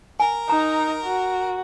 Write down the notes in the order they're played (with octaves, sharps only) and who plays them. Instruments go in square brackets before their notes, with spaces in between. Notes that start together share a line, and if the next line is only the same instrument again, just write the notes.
[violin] A#4 [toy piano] G#5
[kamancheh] D#4 [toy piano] A#5
[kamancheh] F#4